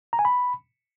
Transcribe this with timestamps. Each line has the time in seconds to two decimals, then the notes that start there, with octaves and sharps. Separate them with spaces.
0.13 A#5
0.19 G#5
0.25 B5